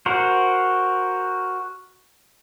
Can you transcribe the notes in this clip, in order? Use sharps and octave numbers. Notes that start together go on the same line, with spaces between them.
F#4 A#4 C5